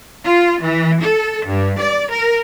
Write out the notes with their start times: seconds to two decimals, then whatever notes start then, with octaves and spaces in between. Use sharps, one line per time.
0.25 F4
0.61 E3
1.01 A4
1.45 G2
1.80 D5
2.12 A#4